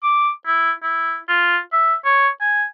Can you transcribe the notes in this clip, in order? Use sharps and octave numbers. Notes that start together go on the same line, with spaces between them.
D6
E4
E4
F4
E5
C#5
G#5